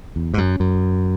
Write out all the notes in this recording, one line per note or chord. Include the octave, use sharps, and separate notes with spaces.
E2
G#2
F#2
F#2